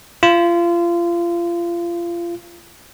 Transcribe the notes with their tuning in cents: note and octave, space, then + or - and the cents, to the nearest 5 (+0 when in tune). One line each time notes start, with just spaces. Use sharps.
F4 -30